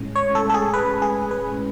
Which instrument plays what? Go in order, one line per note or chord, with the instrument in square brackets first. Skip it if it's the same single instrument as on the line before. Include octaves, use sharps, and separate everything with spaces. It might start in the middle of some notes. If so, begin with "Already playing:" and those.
Already playing: [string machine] A2 G#3 C#4
[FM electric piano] C#5
A4
A4
G#4
B4
G#4
B4